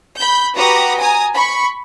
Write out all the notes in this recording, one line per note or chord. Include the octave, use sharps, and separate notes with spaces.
B5 G6
F#4 G4 B4 A#5 D6 D#6
G#5 A#5 D#6
B5 C#6